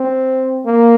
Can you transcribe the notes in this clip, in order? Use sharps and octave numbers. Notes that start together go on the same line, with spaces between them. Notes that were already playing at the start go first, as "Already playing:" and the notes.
Already playing: C4
A#3